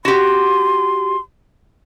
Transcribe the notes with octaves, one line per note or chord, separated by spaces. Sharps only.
F#4 G4 C6